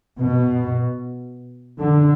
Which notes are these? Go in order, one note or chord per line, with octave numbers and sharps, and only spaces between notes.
B2
D3